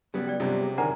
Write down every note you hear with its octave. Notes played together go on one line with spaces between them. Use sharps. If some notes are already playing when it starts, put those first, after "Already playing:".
C#3 F#3 G3 B3
D5 G5
C3 F#3 G3 B3 D4 F4
G#4
D3 D#3 A#4 C5 D5 F#5 G#5 A#5